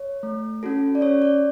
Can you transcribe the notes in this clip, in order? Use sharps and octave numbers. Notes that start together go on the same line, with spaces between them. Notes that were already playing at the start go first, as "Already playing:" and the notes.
Already playing: C#5
A3
C#4 F#4 A4
D5
C#4 C#5
D5